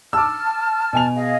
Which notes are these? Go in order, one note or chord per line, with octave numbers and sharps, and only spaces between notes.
A5 D6 E6 F6
B2 G#5 F7
G#4 D#5 F5